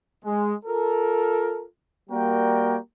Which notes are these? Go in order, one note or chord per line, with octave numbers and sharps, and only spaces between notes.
G#3
F4 A4 A#4
G3 A#3 F#4 A#4 D5 G5